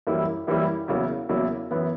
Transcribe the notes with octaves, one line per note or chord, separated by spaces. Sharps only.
F#2 E3 G3 A#3 E4
F#2 E3 G3 A#3 E4
E2 C#3 F#3 A#3 E4
E2 C#3 F#3 A#3 E4
F#2 E3 B3